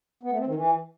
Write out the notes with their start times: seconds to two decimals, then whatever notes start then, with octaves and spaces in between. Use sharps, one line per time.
0.23 B3
0.31 A3
0.39 C4
0.47 D#3
0.55 E3